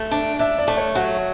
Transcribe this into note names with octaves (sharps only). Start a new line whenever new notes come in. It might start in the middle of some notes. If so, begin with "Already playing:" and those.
Already playing: A3
D4
D4 E5
D5
A3
C#5
F#3